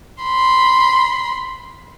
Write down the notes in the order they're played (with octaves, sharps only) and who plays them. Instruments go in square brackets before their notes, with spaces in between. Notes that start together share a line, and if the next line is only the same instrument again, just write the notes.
[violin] B5 C6